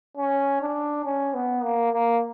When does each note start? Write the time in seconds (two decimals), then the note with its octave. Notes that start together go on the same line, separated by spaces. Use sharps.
0.17 C#4
0.61 D4
1.05 C#4
1.34 B3
1.63 A#3
1.91 A#3